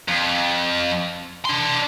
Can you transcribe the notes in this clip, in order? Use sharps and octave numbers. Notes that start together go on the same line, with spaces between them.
F2
D4 C6